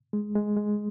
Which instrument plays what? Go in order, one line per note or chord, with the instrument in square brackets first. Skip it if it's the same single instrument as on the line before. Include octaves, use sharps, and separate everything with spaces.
[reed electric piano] G#3
G#3
G#3